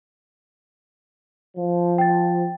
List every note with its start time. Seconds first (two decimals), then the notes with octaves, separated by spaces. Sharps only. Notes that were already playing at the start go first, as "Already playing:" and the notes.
1.57 F3
1.98 G5 A6